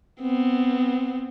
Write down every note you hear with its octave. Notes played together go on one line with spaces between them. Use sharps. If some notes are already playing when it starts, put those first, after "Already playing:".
B3 C4